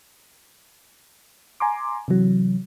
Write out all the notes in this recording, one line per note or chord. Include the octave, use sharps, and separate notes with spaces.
G#5 A#5 C6 D6
C3 E3 F#3